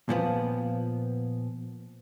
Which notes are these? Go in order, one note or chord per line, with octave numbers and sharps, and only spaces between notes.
A#2 F3 B3